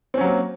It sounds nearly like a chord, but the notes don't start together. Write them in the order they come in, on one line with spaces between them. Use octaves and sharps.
C4 C#4 F#3 A#3